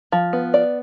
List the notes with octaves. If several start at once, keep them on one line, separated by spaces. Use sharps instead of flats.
F3
B3
D5